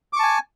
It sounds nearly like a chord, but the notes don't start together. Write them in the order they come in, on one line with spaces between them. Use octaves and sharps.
D6 C#6 A5 G#5